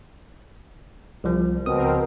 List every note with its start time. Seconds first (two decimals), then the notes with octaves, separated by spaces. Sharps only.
1.24 C2 F3
1.66 C#2 B2 C4 A#4 D#6